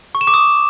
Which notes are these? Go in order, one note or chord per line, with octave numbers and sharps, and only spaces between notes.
C#6
E7
D6
D#6